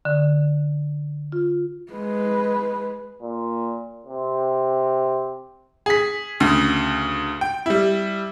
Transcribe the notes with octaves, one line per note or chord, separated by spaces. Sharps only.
D3
F4
G#3 B4
A#2
C3
G#4 B6
D2 C#3
G5
G3 E4